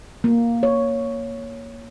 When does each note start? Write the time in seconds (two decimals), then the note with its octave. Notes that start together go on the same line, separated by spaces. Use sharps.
0.24 A#3
0.63 C#5